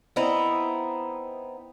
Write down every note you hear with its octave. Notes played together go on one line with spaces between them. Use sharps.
B3 C4 D#4 E4